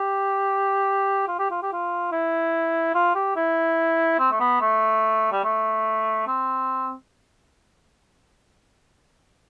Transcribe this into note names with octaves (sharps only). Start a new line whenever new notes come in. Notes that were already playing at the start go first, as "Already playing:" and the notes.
Already playing: G4
F4
G4
F4
G4
F4
E4
F4
G4
E4
C4
A3
B3
A3
G3
A3
C4